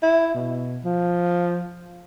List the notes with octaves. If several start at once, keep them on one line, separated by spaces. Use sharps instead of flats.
E4
B2
F3